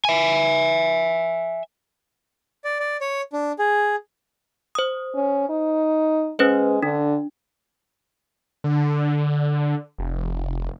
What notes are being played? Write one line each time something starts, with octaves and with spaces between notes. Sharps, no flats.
E5 G#5
D5
D5
C#5
D4
G#4
C5 D#6
C#4
D#4
G#3 C#4 B4 C5
D3 D4
D3
F1